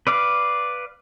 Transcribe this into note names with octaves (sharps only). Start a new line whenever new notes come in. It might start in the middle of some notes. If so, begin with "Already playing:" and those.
B4 D5 F5